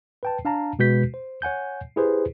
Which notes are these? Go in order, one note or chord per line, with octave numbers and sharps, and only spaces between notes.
B4 G5 A5
D4 F5 A5 A#5
B2 G#3 F#4 B4 G6 B6
C5
C#5 F#5 G#5 G6
E4 G4 G#4 B4 C5